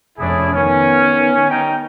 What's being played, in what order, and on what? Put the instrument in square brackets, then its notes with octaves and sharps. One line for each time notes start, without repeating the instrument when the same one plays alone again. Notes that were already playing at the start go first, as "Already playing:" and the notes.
[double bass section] F1 F2 C#4 [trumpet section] D4 E4 G#4
[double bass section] D#3 B3 [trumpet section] C#4
[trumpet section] G3 D#4 G5